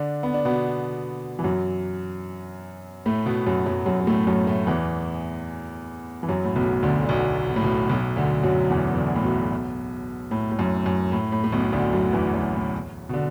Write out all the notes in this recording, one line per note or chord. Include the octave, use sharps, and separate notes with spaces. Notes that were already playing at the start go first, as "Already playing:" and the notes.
Already playing: D3 D4
B3
D4
B2 B3
E3
F#2 F#3
A2 A3
B2 B3
F#2 F#3
F#2 F#3
F#2 F#3
F#3
A2 A3
F#2 F#3
A2 A3
E2 E3
E3
F#2 F#3
A2
B1 B2
D2 D3
D3
B1 B2
B2
A2
B1 B2
B1 B2
D2 D3
F#2 F#3
E2 E3
E3
D2 D3
A2
B1 B2
A2
A2
F#2
F#2
A2
A2
A2
B1 B2
D2 D3
F#2 F#3
E2 E3
F#2
A2
B2
D3